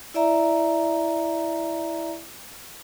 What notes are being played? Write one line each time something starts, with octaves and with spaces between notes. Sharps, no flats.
E4 D5 E5 A#5